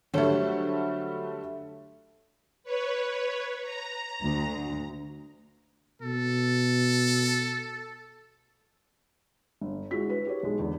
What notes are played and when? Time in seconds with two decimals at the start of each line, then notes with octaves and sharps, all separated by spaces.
0.14 D3 F#3 G3 A3 A4 C5
2.63 B4 C#5
3.61 A#5
4.21 D2
6.02 B2 A4
9.61 G1
9.91 G#3 E4 F#4 B6
10.10 B4
10.27 G4 C#5
10.43 B1 G#3
10.59 E2 D3